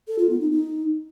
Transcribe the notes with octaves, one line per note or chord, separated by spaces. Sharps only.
A4
F4
B3
D#4
D#4